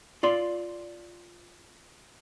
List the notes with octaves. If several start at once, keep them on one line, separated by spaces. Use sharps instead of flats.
F4 D5 C6